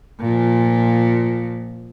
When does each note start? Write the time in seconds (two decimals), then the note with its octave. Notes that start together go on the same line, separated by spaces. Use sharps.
0.21 A#2 F3